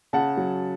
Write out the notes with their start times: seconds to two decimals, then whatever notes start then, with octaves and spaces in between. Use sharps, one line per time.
0.13 C#3 F#5 A5
0.37 F#3